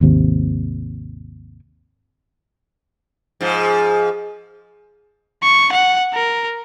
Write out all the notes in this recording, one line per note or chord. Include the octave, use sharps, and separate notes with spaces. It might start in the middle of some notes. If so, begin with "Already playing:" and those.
G#1 D#2 C3
G#2 F3
C#6
F#5
A#4